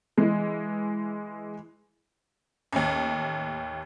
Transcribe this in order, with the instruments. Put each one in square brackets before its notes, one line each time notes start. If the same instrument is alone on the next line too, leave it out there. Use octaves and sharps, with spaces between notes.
[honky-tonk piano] E3 G#3
A1 D#2